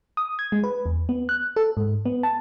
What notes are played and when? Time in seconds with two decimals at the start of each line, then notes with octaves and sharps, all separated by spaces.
0.17 D#6
0.39 G#6
0.52 G#3
0.64 B4
0.86 E2
1.09 B3
1.29 F#6
1.56 A4
1.77 G#2
2.06 B3
2.23 A5